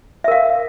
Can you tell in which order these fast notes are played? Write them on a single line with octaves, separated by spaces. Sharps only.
E5 A#4 F5